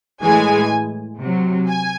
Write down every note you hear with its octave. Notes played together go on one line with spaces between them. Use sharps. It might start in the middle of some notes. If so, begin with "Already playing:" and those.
A2 E3 G#3 G#5
C3 F#3
G#5